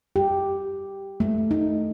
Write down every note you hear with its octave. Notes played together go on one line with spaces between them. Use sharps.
G4
A3
D#4